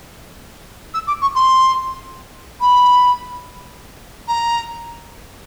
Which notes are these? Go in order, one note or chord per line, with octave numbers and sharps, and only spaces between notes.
E6
D6
C#6
C6
B5
A#5